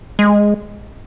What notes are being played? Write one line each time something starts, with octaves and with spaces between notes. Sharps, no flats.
G#3